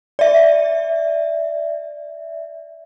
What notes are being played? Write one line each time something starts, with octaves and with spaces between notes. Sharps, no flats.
D5 E5